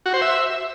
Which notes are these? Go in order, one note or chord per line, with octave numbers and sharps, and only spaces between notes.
F#4
C5
E5